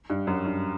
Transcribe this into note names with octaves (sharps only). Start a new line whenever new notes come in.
G2
F#2
G2